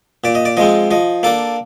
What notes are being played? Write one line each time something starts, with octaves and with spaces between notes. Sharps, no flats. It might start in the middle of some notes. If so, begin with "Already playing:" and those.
A#2 D5
D#5
D5
F3 G#3 C4 D#5
F3 D#5
A#3 D4 A4